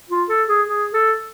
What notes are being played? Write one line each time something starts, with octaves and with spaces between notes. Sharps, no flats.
F4
A4
G#4
G#4
A4